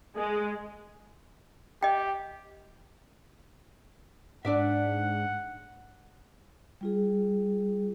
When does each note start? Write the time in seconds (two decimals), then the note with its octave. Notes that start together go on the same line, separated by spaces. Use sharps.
0.16 G#3
1.83 G4 D#5 G5
4.45 G#2 D4 D5 E5 F#5
6.81 G3 F4 G#4